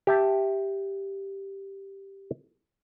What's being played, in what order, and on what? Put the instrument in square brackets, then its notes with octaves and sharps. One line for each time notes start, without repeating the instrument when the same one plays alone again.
[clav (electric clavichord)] G4 E5 A5